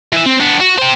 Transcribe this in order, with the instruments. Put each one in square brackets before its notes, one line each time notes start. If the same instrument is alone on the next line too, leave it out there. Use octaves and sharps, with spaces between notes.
[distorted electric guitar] E3 E5
C4
B3 D4
F#4
G4 C5